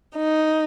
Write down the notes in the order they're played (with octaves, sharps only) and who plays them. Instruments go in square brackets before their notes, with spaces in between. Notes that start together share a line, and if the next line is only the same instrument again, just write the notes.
[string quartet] D#4